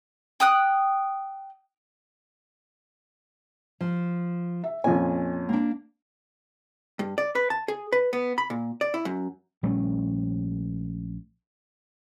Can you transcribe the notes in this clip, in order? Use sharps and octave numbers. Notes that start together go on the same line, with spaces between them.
G5 D#6 F#6
F3
E5
F2 A#2 C#4 G#5
A#3 D4
G2
D5
B4
A5
G#4
B4
B3
B5
A#2
D5
E4
F#2
A#1 G3 A3 C#4